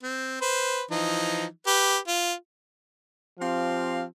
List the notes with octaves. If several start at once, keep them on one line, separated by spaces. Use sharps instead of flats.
C4
B4 C5
E3 F3 D#4
G4 B4
F4
F3 C4 G4 F5